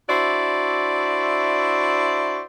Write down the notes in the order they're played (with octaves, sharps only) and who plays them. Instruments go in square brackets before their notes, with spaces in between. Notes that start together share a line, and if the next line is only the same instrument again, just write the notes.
[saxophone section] D4 E4 F#4 C5 D5 E5